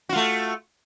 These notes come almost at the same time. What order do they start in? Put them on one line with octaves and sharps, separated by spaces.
F#4 F4 A3